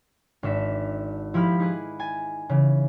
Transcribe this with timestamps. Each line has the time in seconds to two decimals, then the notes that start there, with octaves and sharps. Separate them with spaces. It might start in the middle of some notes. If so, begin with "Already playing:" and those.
0.43 G#1 D4 E5 B6
1.34 F3 E4 F4 G4 B5 F6
1.60 D#4 E4 G#4 B4
2.00 G#5 A6
2.49 C#3 E3